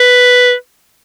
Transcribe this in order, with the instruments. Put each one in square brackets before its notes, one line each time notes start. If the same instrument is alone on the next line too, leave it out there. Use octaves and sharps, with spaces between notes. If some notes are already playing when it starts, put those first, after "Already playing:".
Already playing: [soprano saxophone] B4